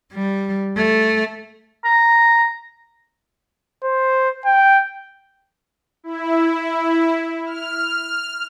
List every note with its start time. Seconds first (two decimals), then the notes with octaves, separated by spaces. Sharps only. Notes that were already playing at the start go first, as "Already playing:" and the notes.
0.13 G3
0.76 A3
1.85 A#5
3.83 C5
4.46 G5
6.04 E4
7.46 F6